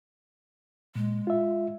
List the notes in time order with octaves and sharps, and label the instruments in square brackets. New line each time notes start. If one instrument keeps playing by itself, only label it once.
[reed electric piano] A#2 [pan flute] G#3
[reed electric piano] F4 E5